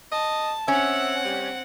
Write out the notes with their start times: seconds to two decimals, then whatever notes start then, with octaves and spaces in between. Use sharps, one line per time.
0.12 D#5 A5
0.68 C4 C#4 E5 F#5
1.25 G3